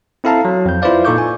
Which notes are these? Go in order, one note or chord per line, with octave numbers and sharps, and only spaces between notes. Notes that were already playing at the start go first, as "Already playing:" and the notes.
C4 E4 A4 F5 A5 A#5
F#3
F2 G6
E4 F4 B4 C5 D5 F5
A#2 D#4 A4 C#6 D6 G6
G#5